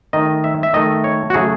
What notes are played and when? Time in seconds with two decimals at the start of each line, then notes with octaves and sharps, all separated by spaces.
0.13 D#3 A3 D#5
0.44 E5
0.63 E5
0.73 D#3 A3 D#5
1.04 C#5
1.30 F#4
1.34 C#3 F#3 A3 G#4